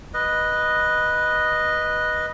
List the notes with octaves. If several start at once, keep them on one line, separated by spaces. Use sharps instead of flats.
B4 D#5